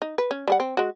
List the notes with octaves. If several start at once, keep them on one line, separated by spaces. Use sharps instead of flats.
D#4
B4
C#4
G3 G#4 F#5
C4
G#3 F#4